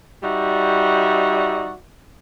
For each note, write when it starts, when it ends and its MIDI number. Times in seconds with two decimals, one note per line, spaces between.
0.23 1.72 55
0.23 1.72 63
0.23 1.72 66
0.23 1.72 74
0.23 1.72 76